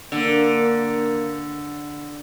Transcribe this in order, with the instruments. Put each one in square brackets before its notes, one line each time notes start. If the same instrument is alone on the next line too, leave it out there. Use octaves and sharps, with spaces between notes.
[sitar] D3 [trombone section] A#3